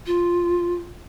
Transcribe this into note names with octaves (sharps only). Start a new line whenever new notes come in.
F4